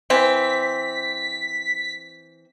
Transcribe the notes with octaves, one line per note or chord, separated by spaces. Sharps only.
E3 C4 B6